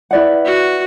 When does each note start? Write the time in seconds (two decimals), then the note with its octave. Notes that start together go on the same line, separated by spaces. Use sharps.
0.11 E4 B4 D5 F#5
0.45 F#4